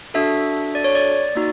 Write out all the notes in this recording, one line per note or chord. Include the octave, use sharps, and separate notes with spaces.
D4 F#4 A4 E5
D5
C#5
D5
A#3 D#4 F#4